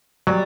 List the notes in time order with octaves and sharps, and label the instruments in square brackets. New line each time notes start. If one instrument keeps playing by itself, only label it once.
[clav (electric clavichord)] F#3 [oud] G3